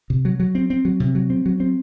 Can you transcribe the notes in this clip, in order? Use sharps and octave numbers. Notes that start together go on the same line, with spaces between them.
C3
F#3
F#3
C4
C4
F#3
C3
F#3
C4
F#3
C4